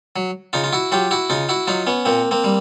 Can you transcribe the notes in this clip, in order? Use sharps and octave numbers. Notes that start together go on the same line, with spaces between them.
F#3
C#3 D#4 F4
F4
E4 F#4
F#3 F4 G4
E4 F#4
C#3 D#4 F4
E4 F#4
F#3 D#4 F4
B3 C#4
A#2 A#3 C4
A#3 C4
G3